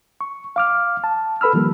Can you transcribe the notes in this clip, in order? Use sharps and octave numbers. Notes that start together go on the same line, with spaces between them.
C#6
F5 D6 F6
A5
A4 B4 B5 E6 F6
D#3 F3 G3 A#3